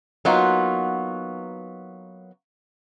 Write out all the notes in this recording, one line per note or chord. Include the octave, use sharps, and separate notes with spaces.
F#3 A#3 B3 D#4 F4 F#4